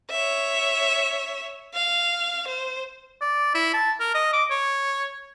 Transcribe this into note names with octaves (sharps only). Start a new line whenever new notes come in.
C#5 E5
F5
C5
D5
E4
A5
A#4
D#5
D6
C#5